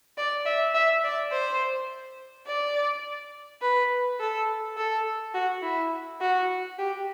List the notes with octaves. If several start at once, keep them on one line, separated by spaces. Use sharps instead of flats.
D5
E5
E5
D5
C5
D5
B4
A4
A4
F#4
E4
F#4
G4